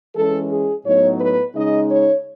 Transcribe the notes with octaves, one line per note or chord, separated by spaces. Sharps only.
E3 G#3 C#4 A4
G#4
A2 F#3 B3 D#4 C#5
B4
C#3 G#3 D#4 D#5
C#5